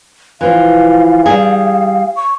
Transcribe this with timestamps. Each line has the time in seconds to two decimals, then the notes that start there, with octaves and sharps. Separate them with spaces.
0.41 E3 F3 F5
1.26 G3 G#4
2.16 C#6